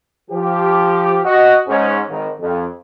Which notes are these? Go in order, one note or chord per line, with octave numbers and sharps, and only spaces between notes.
F3 G4
F#4 D#5
G#2 C#4
G#1 D#3
F2